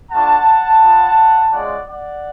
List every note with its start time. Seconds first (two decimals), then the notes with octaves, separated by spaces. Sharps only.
0.11 A3 D4 F4 F#5 A5
0.81 B3 F4
1.51 G#3 C#4 F4 D5 F#5
1.87 D5 F#5